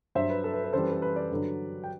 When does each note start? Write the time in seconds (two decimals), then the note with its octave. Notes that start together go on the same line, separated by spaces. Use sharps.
0.15 G2 F#3 C5 E5
0.30 B4
0.44 A4
0.54 B4
0.64 B4
0.73 F#2 E3 G3 A4 C5
0.83 B4
0.92 A4
1.02 B4
1.16 B4 D5
1.31 G2 D3 F#3
1.84 G5